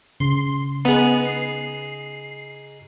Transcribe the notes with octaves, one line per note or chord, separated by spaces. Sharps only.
C#3 C6
B3 D#4 G#4
C7